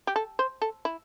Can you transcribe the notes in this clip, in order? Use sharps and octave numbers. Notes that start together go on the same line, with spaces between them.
G4
A4
C5
A4
E4